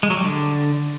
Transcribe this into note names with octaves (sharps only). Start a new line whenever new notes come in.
G#3
F#3
G3
D3